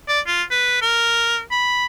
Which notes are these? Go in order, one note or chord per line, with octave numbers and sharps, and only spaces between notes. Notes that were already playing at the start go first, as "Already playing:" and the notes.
D5
F4
B4
A#4
B5